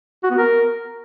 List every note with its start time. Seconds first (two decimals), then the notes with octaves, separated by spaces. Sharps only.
0.23 F#4
0.31 B3
0.38 A#4